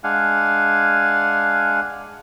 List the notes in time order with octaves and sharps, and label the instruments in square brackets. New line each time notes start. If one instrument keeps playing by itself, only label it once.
[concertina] G#3 D4 F5 F#5 G#5